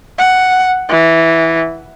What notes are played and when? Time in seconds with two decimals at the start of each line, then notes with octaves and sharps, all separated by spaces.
0.18 F#5
0.89 E3